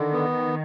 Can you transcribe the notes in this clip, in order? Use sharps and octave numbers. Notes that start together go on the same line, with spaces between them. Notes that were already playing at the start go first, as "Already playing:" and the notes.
Already playing: D3 D#3
B3